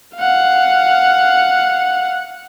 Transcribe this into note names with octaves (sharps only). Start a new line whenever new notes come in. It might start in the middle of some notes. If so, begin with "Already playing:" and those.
F5 F#5